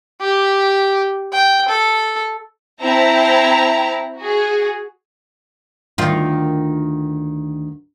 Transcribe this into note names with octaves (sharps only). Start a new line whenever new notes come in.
G4
G5
A4
C4 E4 A5 A#5
F#4 G#4
D2 D#3 F4